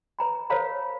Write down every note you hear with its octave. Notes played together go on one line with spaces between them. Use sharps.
B4 A#5 B5
A#4 C5 C#5 F5 A#5 B5